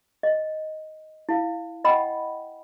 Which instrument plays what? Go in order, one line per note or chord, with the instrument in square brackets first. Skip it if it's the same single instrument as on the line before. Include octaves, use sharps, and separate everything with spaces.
[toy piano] D#5
E4 F5
D#5 F#5 G5 B5